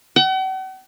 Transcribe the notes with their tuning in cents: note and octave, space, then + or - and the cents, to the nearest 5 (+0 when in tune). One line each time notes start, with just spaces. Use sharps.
F#5 +45